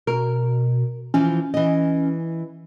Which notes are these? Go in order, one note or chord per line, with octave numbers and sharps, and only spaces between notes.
B2 A#4
E3 F3 C#4
E3 D#5